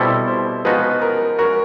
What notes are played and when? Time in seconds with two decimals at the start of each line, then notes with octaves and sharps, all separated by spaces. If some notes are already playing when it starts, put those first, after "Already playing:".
Already playing: B2 G3 C4 E4 A4 C5
0.27 C5
0.65 F3 G#3 B3 D#4 F#4 B4
1.02 A#4
1.39 G#3 C#4 F#4 A#4